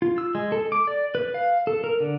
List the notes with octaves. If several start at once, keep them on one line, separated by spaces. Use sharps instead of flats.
F4
E6
G#3
A4
D6
D5
B4
F5
A4
A#4
D3